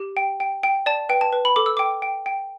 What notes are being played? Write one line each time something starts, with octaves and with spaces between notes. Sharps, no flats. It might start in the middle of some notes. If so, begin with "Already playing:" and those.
Already playing: G4
G5
G5
G5
D5 A5
B4 G5
A5
B4
B5
A4 D6
E6
G5 D6
G5
G5